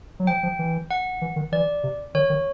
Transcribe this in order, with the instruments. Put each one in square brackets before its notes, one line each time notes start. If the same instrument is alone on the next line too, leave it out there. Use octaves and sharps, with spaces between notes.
[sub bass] F#3
[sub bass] F3 [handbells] G5
[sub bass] F3
E3
[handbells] F#5
[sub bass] E3
D#3
[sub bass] E3 [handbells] D5
[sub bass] C3
[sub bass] D#3 [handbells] C#5
[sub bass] D#3